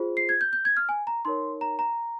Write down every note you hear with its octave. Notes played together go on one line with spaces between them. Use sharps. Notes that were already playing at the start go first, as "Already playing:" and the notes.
Already playing: F4 G#4 C5
C7
G#6
G6
G6
G#6
F6
G#5
A#5
D#4 A#4 C#5 C6
A#5
A#5